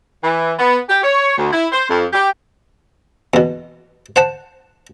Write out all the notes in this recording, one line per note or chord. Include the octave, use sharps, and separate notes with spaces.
E3
B3
G4
C#5
D2
E4
C5
F2
G4
E2 B2
C5 F#5 A5